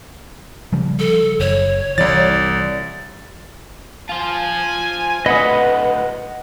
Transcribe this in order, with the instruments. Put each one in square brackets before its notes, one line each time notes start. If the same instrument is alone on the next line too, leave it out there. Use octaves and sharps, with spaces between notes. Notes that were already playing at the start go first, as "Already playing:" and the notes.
[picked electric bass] C#3 F3 G3
[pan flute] A4
[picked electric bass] F#1 [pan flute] C#5
[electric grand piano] C2 D5 A6 [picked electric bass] E3
[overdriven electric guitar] F4 C5 [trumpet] G#5
[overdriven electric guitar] D2 A2 [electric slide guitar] B4 [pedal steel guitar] D#5 F#5 D#6